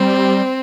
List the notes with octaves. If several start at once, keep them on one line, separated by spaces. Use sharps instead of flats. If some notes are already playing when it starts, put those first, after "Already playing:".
Already playing: G3 C4